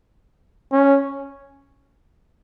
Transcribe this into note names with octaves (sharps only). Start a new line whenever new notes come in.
C#4